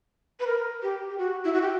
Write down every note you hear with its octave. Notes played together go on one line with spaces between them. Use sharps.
B4
A#4
G4
G4
F#4
E4
F#4
G4